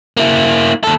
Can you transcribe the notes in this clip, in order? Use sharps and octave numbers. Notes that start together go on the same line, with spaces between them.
A#3 E4
D#2 A4